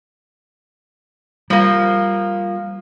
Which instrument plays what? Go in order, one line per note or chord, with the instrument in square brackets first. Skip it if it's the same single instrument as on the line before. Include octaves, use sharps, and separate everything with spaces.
[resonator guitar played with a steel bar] F3 A#3 [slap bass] G3